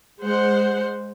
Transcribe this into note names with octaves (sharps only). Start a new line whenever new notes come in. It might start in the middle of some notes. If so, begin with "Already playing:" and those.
G#3 C5 F#5